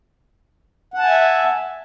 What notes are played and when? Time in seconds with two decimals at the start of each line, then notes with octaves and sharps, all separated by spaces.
0.94 F#5
0.99 A5
1.03 G#5
1.08 E5